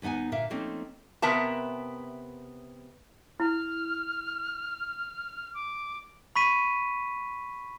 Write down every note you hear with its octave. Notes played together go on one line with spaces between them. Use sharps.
D#2 B3 D#4 F#5 G#5
A#2 D3 A#4 E5 F5
F3 A3 A#3 C4 C#4 D#4
C3 B3 A#4 E5 A5 A#5
E4 F6
D6
B5 C#6 B6 D#7